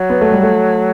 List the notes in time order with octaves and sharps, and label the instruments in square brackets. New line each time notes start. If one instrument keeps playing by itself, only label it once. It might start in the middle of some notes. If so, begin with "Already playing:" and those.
Already playing: [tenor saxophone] F#3
[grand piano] B3
A3
G3
A3